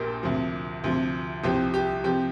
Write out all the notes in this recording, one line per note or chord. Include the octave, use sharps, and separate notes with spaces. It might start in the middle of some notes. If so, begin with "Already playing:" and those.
Already playing: A#1 A#2 G4 A#4
D2 C3 F3
D2 C3 F3
C2 C3 F3 G4
G4
C3 F3 G4